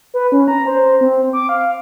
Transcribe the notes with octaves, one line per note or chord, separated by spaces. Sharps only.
B4
C#4
A#5
C5
C4
D6
F5